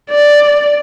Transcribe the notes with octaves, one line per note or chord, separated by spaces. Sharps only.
D5